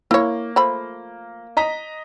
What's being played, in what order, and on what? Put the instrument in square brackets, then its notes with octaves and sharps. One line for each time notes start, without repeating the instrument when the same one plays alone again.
[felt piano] A#3 [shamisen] E4 C#5
[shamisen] F3 A3 B5
[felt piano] D#5 A#5 B6